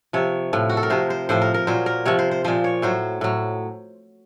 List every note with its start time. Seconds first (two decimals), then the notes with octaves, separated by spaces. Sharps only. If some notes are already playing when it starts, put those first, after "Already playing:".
0.13 C3 F3 C#5
0.53 A2 F3
0.69 F#4
0.77 A4
0.83 A#4
0.90 C3 F3 C5
1.10 C5
1.29 A2 F3 C5
1.42 A#4
1.54 A#4
1.67 A#2 F#3 C5
1.86 A#4
2.05 C3 F3 C#5
2.19 C5
2.31 C5
2.44 A#2 F3 C5
2.64 C#5
2.82 A2 F#3 C5
3.21 A2 F#3